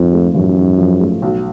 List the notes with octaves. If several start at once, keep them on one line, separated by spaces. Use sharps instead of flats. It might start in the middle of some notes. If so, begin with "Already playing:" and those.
Already playing: F2 G#2 F3
A3
A1 F#2
G#2
F3
A3
B1